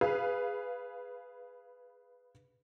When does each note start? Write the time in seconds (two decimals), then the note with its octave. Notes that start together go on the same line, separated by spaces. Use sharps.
0.01 G#4 B4 F5